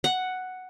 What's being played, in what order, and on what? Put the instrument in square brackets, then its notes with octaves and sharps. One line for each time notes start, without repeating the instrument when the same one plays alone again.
[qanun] F#5